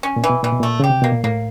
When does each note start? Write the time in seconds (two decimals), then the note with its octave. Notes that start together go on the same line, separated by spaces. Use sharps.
0.03 C#4
0.16 A#2
0.24 E3
0.30 B2
0.43 A#2 E3
0.52 B2
0.60 A#2 A3
0.80 C#3 G4
0.90 C3
1.02 B2 A#3
1.12 A#2
1.24 A2 A#3